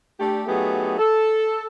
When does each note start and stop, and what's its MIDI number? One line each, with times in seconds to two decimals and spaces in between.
0.19 0.42 57
0.19 0.42 62
0.19 0.42 67
0.47 0.96 54
0.47 0.96 57
0.47 0.96 59
0.47 0.96 63
0.47 0.96 67
0.47 0.96 68
0.98 1.66 69